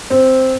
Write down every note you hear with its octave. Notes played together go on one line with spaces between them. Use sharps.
C4